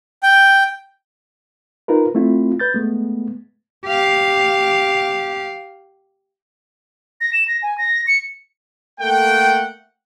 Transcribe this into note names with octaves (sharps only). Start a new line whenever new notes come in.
G5
D#4 F4 A#4 B4
A3 C4 E4 F4
B4 G6 A6
G#3 A3 B3
G4 F5
A#6
E7
A#6
G#5
A#6
C#7
A3 A#3 A4 F#5 G5